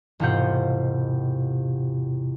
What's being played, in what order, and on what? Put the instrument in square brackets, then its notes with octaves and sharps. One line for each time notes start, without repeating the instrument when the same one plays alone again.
[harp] E1 G#2 C3 F4 F#5 G6